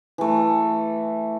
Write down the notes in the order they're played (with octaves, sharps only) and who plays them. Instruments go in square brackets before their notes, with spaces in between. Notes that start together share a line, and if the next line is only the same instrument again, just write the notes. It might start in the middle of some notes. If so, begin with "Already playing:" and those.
[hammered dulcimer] E3 A3